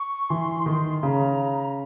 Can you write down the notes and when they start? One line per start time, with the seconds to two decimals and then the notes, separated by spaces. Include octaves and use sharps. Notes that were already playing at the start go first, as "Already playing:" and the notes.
Already playing: C#6
0.29 E3 C6
0.66 D#3
1.03 C#3 A#5